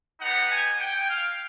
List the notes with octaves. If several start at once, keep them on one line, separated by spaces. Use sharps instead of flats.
B3 D#4 G4 F#5
G#5
G5
F5